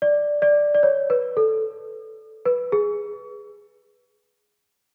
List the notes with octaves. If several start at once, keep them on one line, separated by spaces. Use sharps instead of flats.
D5
D5
D5
C#5
B4
A4
B4
G#4